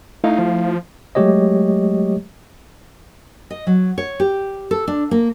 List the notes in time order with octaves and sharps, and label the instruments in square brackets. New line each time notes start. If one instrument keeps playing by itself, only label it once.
[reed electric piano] A3 E4 F5 [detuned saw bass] D#4
[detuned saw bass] F3
[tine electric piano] F#3 G#3 A3 G4 C#5 D#5
[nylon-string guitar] D#5
F#3
C#5
G4
A4
D4
A#3